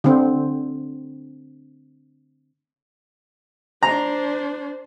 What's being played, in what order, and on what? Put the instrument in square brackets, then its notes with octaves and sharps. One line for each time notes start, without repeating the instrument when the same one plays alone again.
[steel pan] D3 C4
[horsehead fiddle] D4 C5 [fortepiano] A#5